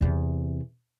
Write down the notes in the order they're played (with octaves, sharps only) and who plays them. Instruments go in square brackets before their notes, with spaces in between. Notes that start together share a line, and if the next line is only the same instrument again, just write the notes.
[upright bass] E2 C3